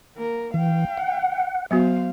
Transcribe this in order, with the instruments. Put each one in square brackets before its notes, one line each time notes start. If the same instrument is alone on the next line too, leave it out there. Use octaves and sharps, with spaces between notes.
[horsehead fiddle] A#3 A#4
[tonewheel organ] E3 [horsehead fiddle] F5 G5
[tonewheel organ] F#5
[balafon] F#3 B3 F#4 [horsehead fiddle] C5 F5